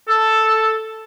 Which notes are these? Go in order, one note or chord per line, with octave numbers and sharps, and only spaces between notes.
A4